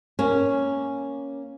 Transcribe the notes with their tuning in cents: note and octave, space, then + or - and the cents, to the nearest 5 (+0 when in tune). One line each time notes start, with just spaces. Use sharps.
A#3 +0 C#4 +0